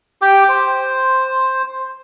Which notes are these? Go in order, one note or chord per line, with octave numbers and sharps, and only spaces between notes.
G4 G5 D6
C5